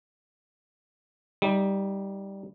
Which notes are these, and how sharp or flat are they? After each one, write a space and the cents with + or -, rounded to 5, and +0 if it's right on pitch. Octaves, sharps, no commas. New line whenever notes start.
G3 +0 D#4 +20